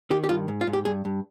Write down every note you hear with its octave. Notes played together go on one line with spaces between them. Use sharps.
D#3 G4
G4
G2 F4
G#2
F4
G#2
G4
G2 G#4
G2